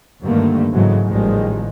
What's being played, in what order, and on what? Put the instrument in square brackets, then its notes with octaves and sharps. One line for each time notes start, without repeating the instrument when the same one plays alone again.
[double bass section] G2 D3 D#3 A3 A#3
G#2 C#3 E3 F#3 G#3 A3
A1 D#3 F3 G3 G#3